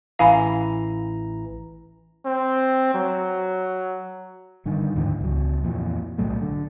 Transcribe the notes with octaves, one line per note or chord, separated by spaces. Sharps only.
A1 E3 F5 G#5 A#5 B5
C4
F#3
G2 D3 D#3
D#2 G#2 D3 E3
C#2 F#3
F2 A#2 E3
B1 A2 F#3 A3
D3